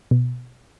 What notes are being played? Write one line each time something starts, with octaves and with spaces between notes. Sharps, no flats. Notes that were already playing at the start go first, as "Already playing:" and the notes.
B2